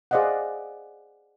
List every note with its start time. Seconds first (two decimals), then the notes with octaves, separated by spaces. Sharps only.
0.11 G#4 C5 D5 D#5 F5 F#5